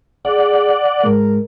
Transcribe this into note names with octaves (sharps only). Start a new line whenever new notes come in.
G#4 D5 F#5
G#2 G#3 A#4